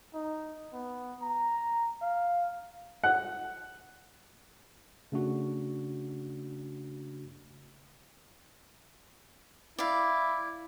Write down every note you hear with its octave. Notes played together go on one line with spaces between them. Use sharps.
D#4
B3
A#5
F5
F#5
C#3 A3 D4 F#4
E4 D5 F5